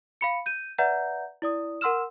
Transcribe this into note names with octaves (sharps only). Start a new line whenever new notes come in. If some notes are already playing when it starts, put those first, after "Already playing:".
F5 B5 C#7
G6 D#7
B4 D5 E5 F#5 A#5 G6
E4 D5 D#6
A#4 F#5 C6 E6 F6 E7